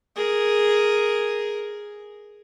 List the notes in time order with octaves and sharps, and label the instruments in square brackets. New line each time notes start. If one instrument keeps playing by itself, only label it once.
[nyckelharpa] G#4 A#4